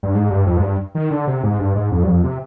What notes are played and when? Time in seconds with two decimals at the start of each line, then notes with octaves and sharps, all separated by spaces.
0.03 G2
0.15 G#2
0.30 G2
0.46 F2
0.57 G#2
0.63 G2
0.95 D#3
1.11 D3
1.27 C3
1.43 G#2
1.59 G2
1.75 G#2
1.92 F2
2.03 G2
2.07 F2
2.24 C3